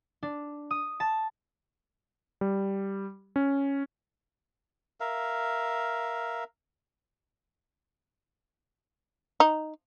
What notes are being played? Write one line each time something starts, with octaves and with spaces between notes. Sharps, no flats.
D4
D#6
A5
G3
C#4
A#4 E5 F5
D#4